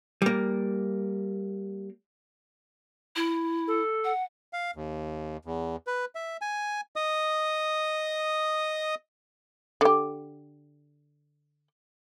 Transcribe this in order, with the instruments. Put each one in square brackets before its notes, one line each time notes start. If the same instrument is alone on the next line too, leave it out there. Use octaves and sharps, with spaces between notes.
[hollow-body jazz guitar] G3 A#3
[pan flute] E4
[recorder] A4
[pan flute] F#5
[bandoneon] F5
D#2
E2
B4
E5
G#5
D#5 D#6
[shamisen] D3 G4